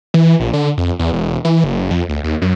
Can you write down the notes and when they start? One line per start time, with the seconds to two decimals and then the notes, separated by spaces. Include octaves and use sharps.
0.14 E3
0.40 A#1
0.53 D3
0.77 F2
0.99 E2
1.12 E1
1.45 E3
1.64 F#1
1.91 F2
2.09 D2
2.24 D#2
2.42 F#2